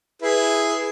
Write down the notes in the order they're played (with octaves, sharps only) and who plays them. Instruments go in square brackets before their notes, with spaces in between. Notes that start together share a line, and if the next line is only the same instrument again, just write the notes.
[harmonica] E4 G#4 B4